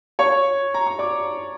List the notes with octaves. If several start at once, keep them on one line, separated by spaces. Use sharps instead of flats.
C#5 C#6
A#5
C#6
D5 D6